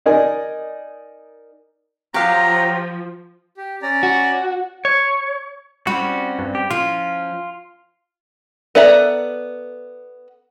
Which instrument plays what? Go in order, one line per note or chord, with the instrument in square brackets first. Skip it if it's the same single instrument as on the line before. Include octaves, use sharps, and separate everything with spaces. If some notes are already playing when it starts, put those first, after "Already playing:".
[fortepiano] D#4 A#4 D5 D#5 G#5
[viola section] F3 [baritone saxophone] F#3 [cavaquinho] G4 F5 [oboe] A#5
[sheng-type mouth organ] G4
C#4 D5 A#5
[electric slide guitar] F#4
[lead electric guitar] C#5
[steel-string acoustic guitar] G3 C4 C#4 [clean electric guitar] F#4
[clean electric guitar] G2
G4
[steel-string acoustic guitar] F3 C#4 [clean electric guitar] F4
[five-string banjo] B3 A4 D5 E5 A#5